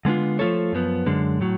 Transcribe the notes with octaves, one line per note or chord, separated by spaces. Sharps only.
D3 G#3 B3 D4 F4
F3 A3 F4 A4 C#5
F#2 F3 B3
F#2 D3 G#3
A2 F#3